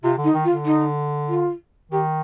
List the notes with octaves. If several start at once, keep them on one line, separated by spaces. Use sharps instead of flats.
C3 F4
D3
D#4
D#3
F4
D3
D#4
F4
D#3 G4